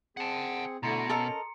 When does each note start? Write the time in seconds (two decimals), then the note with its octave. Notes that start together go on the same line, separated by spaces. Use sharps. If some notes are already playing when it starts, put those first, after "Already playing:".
0.17 C4 G#4 F#5 A5
0.83 B2 D3 A3 E4 A#5 C6 C#7
1.09 C#4 A4 A#4 D#5